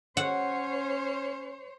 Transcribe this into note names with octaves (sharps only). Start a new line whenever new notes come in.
C#4 C5 C#5 F#5